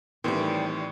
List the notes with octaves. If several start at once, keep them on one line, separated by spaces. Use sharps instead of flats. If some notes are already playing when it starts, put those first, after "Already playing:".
A2 D#3 E3 G3 C4